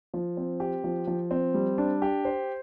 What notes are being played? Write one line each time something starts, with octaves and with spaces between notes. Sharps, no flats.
F3
C4
G4
F3
F3
C4
G3
D4
G4
C5